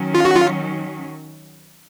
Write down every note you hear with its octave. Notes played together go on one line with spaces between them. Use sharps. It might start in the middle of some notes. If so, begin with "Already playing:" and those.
Already playing: D#3 F#3 C#4
F4
F#4
F4